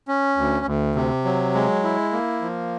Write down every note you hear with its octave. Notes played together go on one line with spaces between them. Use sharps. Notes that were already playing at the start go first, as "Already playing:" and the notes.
C#4
D2
D2
C3
F#3
G#3
E4
A#3
F3